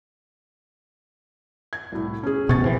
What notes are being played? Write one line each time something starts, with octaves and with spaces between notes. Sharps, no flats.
G#6
C2 A2
C#4 G#4
A1 B2 C#6 G#6 A6
A#1 E3 C4